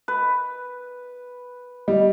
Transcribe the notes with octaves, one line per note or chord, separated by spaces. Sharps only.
B4
G3 D#5